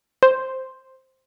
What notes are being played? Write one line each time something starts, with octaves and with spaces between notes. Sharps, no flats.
C5